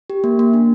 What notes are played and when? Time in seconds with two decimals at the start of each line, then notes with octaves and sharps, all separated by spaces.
0.10 G4
0.24 A#3
0.39 A#3
0.54 D4